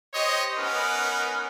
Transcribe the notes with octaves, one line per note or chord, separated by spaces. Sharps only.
G4 C5 C#5 D#5
B3 C#4 D#4 A#4 B4